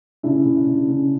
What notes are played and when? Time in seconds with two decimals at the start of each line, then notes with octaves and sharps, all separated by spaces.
0.23 C#3 D4 E4
0.45 C#3
0.67 C#3
0.88 C#3